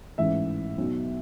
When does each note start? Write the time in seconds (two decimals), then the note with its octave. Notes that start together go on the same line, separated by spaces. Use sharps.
0.18 A1 G#2 E3 E5
0.78 B1 B2